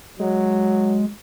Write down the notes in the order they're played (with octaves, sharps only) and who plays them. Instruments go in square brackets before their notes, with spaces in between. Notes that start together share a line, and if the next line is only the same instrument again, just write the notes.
[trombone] F#3 [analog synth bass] G#3